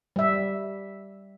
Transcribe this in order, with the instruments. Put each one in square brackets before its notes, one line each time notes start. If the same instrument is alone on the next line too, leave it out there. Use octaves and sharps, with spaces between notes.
[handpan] G3 E5